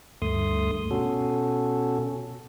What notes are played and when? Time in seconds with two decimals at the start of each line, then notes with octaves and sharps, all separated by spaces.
0.22 D2 G2 A3 C6 D#6
0.91 B2 C#4 F#4 A4